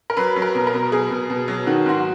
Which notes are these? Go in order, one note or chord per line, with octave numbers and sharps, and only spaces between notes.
A#4
F#3 B4
F#3
A#4
B2
A#4
B2
B2 G#4
B2
B2
F#3
D#3 F#4
G#2 F#4